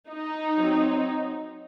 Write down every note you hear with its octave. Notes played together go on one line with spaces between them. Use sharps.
D#4
F#3 C4